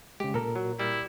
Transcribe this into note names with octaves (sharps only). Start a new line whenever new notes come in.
C#3 G#3 G4
A#2 A4 A#4
F#3
G3 E4